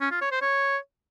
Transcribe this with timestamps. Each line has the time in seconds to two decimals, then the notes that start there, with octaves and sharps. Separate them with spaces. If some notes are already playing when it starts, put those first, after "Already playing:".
0.01 C#4
0.11 F4
0.21 C#5
0.31 C5
0.42 C#5